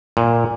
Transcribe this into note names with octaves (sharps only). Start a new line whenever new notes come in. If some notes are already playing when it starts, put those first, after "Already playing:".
A#2